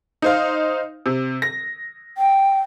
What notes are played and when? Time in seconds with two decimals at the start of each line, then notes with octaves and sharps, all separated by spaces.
0.22 D#4 C5 F5
1.06 C3
1.42 A#6
2.18 G5